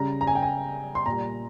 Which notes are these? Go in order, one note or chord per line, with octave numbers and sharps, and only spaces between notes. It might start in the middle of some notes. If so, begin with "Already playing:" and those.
Already playing: C#3 G3 A#5
A#5
G#5
G5
G#5
C6
A#2 G3 A#5